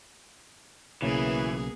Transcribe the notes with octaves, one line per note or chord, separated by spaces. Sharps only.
B1 C#3 E3 A#3 B3 G#4 C#5